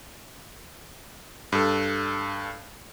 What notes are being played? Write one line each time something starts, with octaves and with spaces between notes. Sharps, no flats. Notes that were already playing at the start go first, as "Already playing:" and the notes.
G2 A4